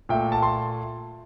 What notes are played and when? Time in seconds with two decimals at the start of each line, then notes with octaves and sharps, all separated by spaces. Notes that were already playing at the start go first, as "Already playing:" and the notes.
0.09 A#2 A3 G5
0.32 A5
0.42 C6